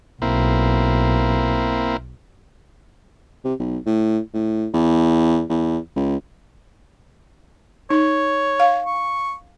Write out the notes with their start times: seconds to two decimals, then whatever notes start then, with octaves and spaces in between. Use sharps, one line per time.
0.22 B1 A#3 C4 E4
3.44 C3
3.60 B1
3.86 A2
4.34 A2
4.74 E2
5.50 E2
5.96 C#2
7.90 D#4 C#5
8.60 F5
8.86 C#6